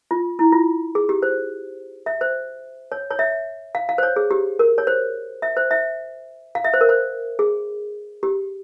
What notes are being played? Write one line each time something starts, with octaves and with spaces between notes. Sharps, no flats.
F4
E4
F4
G#4
G4
C5
E5
C5
C#5
C#5
E5
F5
F5
C5
C#5
G#4
G4
A#4
C#5
C5
E5
C5
E5
F5
E5
C5
A#4
C5
G#4
G4